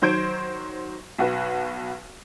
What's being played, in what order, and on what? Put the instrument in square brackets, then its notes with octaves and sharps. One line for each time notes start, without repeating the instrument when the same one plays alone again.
[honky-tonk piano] D#3 F#3 C5 G6 G#6 D7
B1 F#4 B4